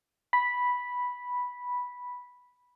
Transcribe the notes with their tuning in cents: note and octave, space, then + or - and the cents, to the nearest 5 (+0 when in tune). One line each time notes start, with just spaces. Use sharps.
B5 -5